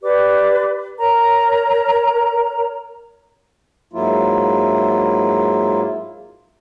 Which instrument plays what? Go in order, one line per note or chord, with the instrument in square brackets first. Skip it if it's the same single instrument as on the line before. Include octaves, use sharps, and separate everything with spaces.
[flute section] G4 B4 D5 D6
A#4 C#5 A#5
[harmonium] G#2 F#3 A#3 E4 F4